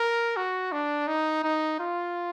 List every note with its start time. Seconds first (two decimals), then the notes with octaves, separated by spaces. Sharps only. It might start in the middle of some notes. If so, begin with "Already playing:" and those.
Already playing: A#4
0.36 F#4
0.72 D4
1.07 D#4
1.43 D#4
1.79 F4